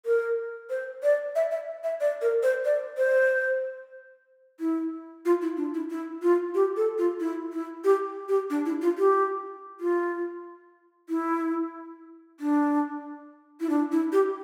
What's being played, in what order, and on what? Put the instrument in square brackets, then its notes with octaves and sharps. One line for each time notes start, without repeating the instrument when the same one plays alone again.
[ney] A#4
C5
D5
E5
E5
E5
D5
A#4
C5
D5
C5
E4
F4
E4
D4
E4
E4
F4
G4
A4
F4
E4
E4
G4
G4
D4
E4
F4
G4
F4
E4
D4
E4
D4
E4
G4